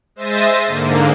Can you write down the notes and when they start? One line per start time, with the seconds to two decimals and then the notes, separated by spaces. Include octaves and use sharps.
0.16 G#3 C5 E5 A6 A#6 D#7
0.67 G#2 D3 A#3